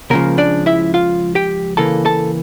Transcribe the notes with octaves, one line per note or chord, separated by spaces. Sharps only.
C#2 C#3 F3 A#3 A#4
D4 D5
E4 E5
F4 F5
G4 G5
C#3 E3 A#3 A4 A5
A4 A5